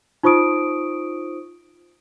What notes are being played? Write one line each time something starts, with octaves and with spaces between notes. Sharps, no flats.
D#4 F4 C5 C#6 D#6 D7